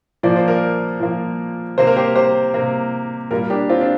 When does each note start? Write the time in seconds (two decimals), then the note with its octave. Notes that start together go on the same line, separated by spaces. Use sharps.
0.23 A#2 F3 A#3 D5
0.36 C5
0.48 A#4 D5
1.00 A#2 F3 A#3
1.78 C3 A#3 C5
1.87 A#4
1.96 G4 C5
2.15 G4 C5
2.54 C3 A#3
3.31 A#2 G3 A#3 F4 A#4
3.50 D4 G4
3.69 C4 F4
3.81 D4